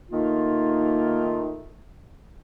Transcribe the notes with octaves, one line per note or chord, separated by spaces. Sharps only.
D#3 A3 A#3 D#4 F4